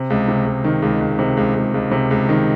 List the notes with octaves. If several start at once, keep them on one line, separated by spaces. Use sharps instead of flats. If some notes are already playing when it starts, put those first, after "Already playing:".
Already playing: C3
C#2
C3
C#2
D#3
C#2
C#2
C3
C#2
C#2
C#2
C3
C#2
D#3